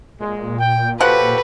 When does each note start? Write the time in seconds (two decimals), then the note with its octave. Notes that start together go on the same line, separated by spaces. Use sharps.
0.20 A#2 G#3
0.59 G5
1.00 F3 F#4 G4 A4 B4 F#5